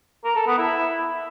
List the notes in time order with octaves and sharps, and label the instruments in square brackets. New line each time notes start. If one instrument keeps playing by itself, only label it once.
[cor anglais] A#4
A4
B3
E4